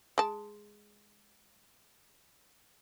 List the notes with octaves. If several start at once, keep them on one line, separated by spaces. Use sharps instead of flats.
G#3 A5